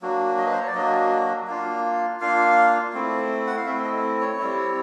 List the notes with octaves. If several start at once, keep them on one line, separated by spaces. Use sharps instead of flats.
F#3 A#3 D4 F#4
D#5
B4
C5
C#5
D5
F#3 A#3 D4 F#4 D#5
A#3 D4 F4
A#3 D4 F4 F5
A3 C4 E4
F#5
F5
A3 C4 E4 E5
D#5
C#5
G3 C4 E4